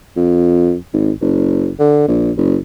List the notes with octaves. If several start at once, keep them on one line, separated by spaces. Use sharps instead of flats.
F2
G#1
F#1
D3
A#1
F#1